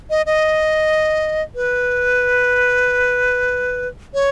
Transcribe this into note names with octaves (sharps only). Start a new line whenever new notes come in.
D#5
D#5
B4
C#5